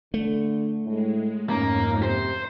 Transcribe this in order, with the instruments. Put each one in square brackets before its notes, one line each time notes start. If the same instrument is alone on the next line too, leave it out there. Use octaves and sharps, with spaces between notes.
[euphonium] D3 [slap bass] A3
[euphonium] A2 [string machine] G#3
[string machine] F2 G#2 D#4 [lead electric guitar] A#3 [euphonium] C#4
[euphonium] C3 [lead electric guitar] C5